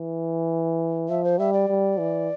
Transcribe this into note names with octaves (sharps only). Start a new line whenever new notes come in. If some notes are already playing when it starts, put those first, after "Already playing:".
Already playing: E3
F3 E5
C5
G3 E5
D5
G3
E3